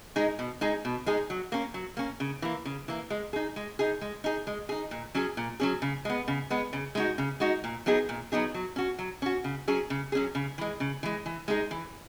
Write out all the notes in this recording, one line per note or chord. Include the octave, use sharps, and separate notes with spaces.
G#3 D#4 G#4
B2
G#3 D#4 G#4
B2
G#3 D#4 G#4
F#3
A#3 C#4
F#3
A#3 C#4
C#3
E3 A#3
C#3
E3 A#3
G#3
D#4 G#4
G#3
D#4 G#4
G#3
D#4 G#4
G#3
D#4 G#4
A#2
F#3 C#4 G#4
A#2
F#3 C#4 G#4
C#3
G#3 B3
C#3
G#3 B3
C#3
G#3 D#4 F#4
C#3
G#3 D#4 F#4
A#2
F#3 B3 D#4 G#4
A#2
F#3 B3 D#4 G#4
F#3
C#4 F#4
F#3
C#4 F#4
C#3
F#3 C#4 G#4
C#3
F#3 C#4 G#4
C#3
E3 G#3
C#3
E3 G#3
E3
G#3 D#4 G#4
E3